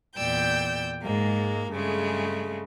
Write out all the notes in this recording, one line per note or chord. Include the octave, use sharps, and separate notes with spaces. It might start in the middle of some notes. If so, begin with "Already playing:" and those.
E2 A#2 D5 G5 E6 G6
G#2 G#3 A#3
G2 C#3 G#3 A3